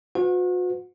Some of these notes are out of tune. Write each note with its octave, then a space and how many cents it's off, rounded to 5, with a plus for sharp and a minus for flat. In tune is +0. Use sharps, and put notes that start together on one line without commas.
F#4 -40 B4 +40 F#5 -35